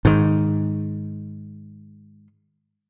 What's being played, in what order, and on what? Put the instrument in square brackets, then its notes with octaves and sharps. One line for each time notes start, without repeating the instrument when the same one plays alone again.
[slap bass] G#2 D#3